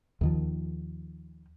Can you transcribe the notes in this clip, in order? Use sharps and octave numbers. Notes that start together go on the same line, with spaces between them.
D#2 D#3 F3